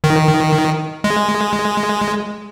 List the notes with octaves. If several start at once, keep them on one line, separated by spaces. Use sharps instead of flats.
D#3
G#3